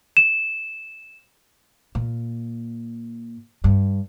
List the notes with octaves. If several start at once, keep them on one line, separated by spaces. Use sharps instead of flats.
E7
A#2
G2